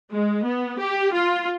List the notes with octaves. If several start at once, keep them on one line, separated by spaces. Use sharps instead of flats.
G#3
B3
G4
F4